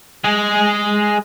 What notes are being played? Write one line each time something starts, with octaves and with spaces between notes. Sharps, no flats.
G#3 G#4